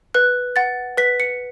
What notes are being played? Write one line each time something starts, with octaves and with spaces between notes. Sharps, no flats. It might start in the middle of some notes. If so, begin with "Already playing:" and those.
B4 F#6
F#5 A6
B4 B6
C#7